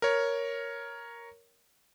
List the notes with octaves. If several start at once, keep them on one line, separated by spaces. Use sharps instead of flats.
A#4 C#5